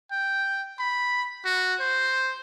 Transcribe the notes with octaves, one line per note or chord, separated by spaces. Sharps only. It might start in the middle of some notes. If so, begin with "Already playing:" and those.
G5
B5
F#4
C5